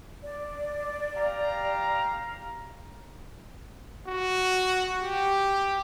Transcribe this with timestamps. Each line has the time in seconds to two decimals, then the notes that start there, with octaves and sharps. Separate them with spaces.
0.24 D5
1.16 G4 F5 A#5
4.07 F#4
5.01 G4